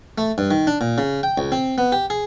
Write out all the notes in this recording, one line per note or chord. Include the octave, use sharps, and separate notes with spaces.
A3
G2
D#3
D4
A#2
C#3
G5
C#2
C4
B3
G4
G#4